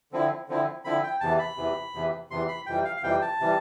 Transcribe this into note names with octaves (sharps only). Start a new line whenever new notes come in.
D3 F3 C4 E4
D3 F3 C4 E4
D3 F3 C4 E4 B5
G5
E2 C3 E3 A5
B5
E2 C3 E3
E2 C3 E3
E2 C3 E3 C6
B5
F2 C3 E3 G3 G5
F5
F5
F2 C3 E3 G3 G5
A5
C3 E3 G3